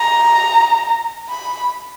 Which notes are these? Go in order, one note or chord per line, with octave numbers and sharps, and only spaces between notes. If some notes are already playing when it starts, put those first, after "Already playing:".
Already playing: A#5
B5